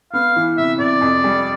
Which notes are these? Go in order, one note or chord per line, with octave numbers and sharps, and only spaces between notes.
B3 F5
E3
C3 E5
C3 D5
F2
G3